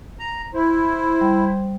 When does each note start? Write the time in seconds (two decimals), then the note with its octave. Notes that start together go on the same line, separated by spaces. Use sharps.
0.19 A#5
0.54 E4 C5
1.21 G3